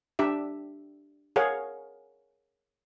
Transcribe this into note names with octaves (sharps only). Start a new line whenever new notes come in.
D4 G4 E5
G#4 A#4 C#5 F5 F#5